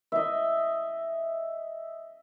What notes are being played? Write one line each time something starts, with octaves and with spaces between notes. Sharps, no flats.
D#5 E5